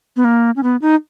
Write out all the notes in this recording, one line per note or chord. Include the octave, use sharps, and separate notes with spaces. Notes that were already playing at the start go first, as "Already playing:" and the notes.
B3
A#3
C#4
B3
D#4